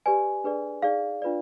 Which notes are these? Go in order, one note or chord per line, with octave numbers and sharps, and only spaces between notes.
G4 B4 D5 G#5
D4 G#4 B4 D5
D#4 G#4 D5 F5
D4 F4 B4 D5